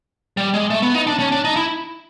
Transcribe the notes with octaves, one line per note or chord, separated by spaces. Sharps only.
G3
G#3
A3
B3
D#4
D4
C#4
D4
D#4
E4